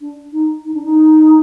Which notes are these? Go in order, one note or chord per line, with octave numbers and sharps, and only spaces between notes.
D4
D#4
D#4
D4
D#4